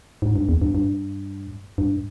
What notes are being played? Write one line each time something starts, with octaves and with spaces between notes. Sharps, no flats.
G#2
G2
E2
G2
G2
G2